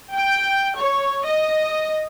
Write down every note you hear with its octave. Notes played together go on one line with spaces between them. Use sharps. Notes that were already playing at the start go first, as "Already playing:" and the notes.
G5
C#5
D#5